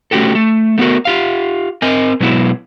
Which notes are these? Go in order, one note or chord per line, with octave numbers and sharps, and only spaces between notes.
A3 C#4 F#4 G4 A4
A3
A3 B3 D#4 F#4 A#4
F4 G4 F5
C4 A#4 D#5 G#5
B2 F#3 G#3 B3 E4